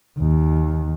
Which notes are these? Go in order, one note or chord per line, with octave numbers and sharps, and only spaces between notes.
D#2